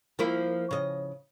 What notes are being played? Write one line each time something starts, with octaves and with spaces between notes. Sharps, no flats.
F3 A#3 E4
C#3 D#5